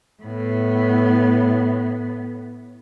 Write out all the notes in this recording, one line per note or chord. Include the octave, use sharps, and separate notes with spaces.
A2 B3